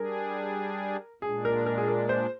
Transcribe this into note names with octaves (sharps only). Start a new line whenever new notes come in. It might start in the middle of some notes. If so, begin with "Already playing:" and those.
Already playing: G3 D4 G#4 A#4
A#2 G#3 D4 G#4
A#4
A#4
G#4
A#4
C5